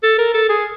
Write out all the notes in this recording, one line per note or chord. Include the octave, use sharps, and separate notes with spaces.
A4
A#4
A4
G#4